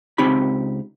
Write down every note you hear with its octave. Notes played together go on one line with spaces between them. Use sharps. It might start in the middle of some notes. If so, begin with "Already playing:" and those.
C#2 C4 D#4 G4 B5